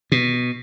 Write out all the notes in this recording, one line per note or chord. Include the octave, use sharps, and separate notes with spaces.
B2